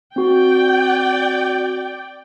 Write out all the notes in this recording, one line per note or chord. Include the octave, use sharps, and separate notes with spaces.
C4 F#4 D5 G5